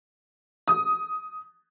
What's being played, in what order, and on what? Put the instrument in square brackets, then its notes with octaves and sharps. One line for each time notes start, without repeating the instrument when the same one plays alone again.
[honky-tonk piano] D#6